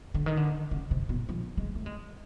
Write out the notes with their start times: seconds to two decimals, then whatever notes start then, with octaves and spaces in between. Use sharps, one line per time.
0.14 D3
0.26 D#3
0.37 D3
0.71 C#3
0.91 C3
1.09 B2
1.29 F3
1.57 G#3
1.75 A3
1.86 G#3